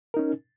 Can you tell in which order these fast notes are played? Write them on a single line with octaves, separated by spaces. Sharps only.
A#4 D#4 C#4